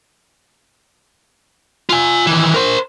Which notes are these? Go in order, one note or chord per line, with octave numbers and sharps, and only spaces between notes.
F4 G#5
D#3 E3
A#4 C5